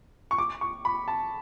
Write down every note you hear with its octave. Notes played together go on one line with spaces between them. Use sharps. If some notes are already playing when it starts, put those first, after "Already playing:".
C#6
D6
C#6
B5
A5